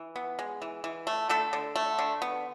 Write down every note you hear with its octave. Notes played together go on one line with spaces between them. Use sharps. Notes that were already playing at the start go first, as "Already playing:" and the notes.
Already playing: E3
B3
G#3
E3
E3
A3
D3 A3 A4
D3
A3
D3
B3